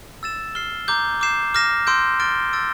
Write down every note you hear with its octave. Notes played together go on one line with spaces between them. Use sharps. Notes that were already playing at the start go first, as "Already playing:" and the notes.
E6 A6 E7
F6 C7 G7
A#5 D6 G6
D6 G6 C7 E7
D6 F6 A#6 E7
C6 E6 G6 D7
F6 A6 D7 G7
E6 A6 D7